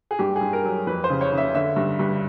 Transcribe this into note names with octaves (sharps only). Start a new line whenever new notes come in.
G#4
G2 G4
G#4
G2
A#4
F#3
F2 B4
C5
C#3
C#5
C#3
E5
D3 E5
G2
G2